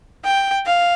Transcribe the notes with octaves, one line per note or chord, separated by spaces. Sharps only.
G5
F5